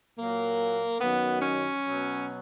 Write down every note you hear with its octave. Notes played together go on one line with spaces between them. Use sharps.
A#2 F#3 A#3
F#2 D#3 F#3 B3
C#4
B2 F#3